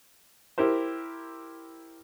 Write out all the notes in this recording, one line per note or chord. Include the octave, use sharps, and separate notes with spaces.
E4 G4 A#4 C5